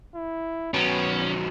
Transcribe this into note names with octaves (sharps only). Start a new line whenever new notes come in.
E4
D#3 F#3 B3 C#4